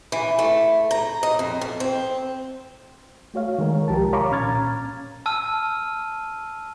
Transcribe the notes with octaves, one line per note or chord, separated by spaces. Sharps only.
E3
A3
A#5
D#5
F2
F2
C4
A3 F#4 C#5 F5
D#3 G#3 A#4 C#5
C2 F3 G4 A#4 A5
C#5 F5 A#5 B5 C#6 D6
A#2 C#4 A#5 F6 G#6 A6
A5 E6 F6 D#7